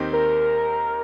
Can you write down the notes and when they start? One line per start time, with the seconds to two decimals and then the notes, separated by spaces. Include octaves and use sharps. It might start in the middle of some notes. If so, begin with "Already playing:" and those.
Already playing: D#2 D#3 C4 D#4 G4
0.13 A#4